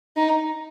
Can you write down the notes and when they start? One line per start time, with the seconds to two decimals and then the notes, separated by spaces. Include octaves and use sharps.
0.17 D#4